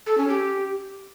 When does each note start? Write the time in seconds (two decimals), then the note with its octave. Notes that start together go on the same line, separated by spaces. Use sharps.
0.06 A4
0.18 C#4
0.29 G4